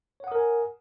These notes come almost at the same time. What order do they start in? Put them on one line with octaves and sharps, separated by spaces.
C#5 F#5 D#6 A#4 G#5